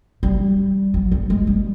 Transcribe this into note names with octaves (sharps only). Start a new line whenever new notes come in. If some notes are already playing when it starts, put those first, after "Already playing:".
G3
F#3
G3
G#3
G3